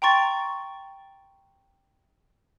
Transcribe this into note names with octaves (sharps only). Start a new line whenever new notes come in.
G5 A#5 C6 C#6 A6